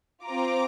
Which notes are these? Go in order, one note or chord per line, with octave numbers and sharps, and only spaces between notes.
C4 F4 A#5 D6